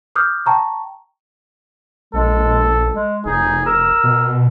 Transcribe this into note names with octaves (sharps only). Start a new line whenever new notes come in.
D6 D#6 F6 G6
G5 A5 A#5 C#6
A#1 G#3 A4
G#3
F1 D#4 G#4
A#4 E6
B2